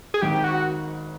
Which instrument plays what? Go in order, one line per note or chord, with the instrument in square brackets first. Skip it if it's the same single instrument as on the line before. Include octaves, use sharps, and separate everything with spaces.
[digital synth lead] G#4
[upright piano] G#1 G#2 D#3 [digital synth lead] G4
[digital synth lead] F#4